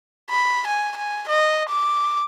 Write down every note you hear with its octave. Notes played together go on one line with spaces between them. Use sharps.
B5
G#5
G#5
D#5
D6